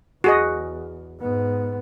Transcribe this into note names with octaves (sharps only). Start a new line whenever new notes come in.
E2 F#4 G#4 D#5
G#2 B3